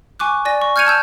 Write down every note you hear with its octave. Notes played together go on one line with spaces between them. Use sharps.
G#5 C#6 D6 F#6
D5 G#5 A#6
C#6
F6 G6 G#6 C#7 D#7 F7
A5 E6 G6